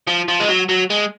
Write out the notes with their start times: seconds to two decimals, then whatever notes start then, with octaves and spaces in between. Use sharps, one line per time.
0.07 F3
0.28 F3
0.40 G#3
0.49 F#3
0.69 F#3
0.90 G#3